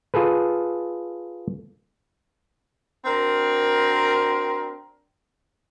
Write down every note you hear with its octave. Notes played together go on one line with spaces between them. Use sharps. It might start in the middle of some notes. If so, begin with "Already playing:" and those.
F4 G#4 A4 B4
C4 D4 F#4 A#4